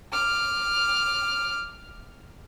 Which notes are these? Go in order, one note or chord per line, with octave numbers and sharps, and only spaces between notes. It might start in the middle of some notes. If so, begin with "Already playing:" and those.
D6 F6